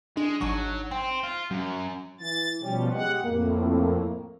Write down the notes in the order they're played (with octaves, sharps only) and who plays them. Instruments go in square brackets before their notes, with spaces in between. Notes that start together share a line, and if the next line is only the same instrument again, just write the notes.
[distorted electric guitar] G#3 [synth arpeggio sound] D4
[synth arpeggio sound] G#1 D#4 C#6 [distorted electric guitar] F#3
[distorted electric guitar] C4 [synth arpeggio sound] G5
[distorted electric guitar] F4
[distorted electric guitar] F#2 [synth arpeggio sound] F#3
[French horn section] E3 [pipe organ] A6
[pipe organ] B2 F3 G3 [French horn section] C#4 G4
[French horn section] G#3 G4 [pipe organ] F#5
[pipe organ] F2 A2 [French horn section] A#3